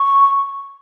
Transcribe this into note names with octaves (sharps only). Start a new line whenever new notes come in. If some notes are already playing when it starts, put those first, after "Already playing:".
Already playing: C#6